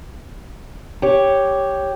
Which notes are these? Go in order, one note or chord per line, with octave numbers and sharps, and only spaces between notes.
G4 C#5